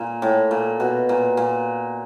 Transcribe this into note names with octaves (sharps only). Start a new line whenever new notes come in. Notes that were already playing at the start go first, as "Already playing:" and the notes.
Already playing: A#2
A2
A#2
B2
A#2
A#2